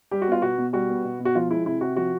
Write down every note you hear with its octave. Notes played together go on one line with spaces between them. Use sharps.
G3 G4
F#4
B3 F4
B2 F#4
B2
G3 F#4
B3
B2
B2
F#4
F3 F4
G#3 E4
C3 E4
C3 F#4
F3 F#4